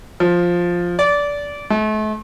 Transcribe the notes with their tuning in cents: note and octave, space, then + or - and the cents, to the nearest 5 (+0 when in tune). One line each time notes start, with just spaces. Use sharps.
F3 +5
D5 -20
A3 -40